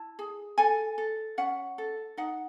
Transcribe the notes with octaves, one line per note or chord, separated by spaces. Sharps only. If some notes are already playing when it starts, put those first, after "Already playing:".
Already playing: E4 A5
G#4
A4 G#5
A4
C#4 F#5
A4
D#4 F#5